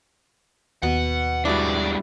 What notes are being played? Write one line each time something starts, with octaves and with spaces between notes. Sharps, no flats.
D#2 B2 F#5
G3 G#3 D4 E4 F#4 D5